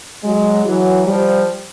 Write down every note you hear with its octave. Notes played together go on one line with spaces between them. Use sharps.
F#3 G#3
E3 F#3
F3 G3